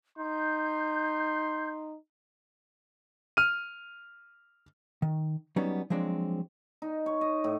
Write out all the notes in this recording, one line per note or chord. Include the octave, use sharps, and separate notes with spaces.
D#4 C6 G6
F6 D#7
D#3
F#3 G3 B3 C#4 D#4
F3 F#3 G#3 C4 D4
D#4
C#5
D#5
A2